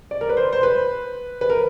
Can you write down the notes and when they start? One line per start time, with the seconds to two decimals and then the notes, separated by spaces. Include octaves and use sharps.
0.11 D5
0.21 A#4
0.29 B4
0.37 C5
0.53 C5
0.63 B4
1.41 B4
1.50 A#4